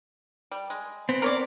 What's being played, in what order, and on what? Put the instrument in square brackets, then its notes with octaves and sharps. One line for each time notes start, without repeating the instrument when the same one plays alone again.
[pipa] G3
G#3
[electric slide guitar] B3 C4
[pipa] A#4 C#5 D5